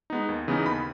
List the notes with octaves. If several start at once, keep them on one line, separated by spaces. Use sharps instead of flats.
G#3 B3 D#4
D#2
C#3 E3 B3 D#4
D#2 B5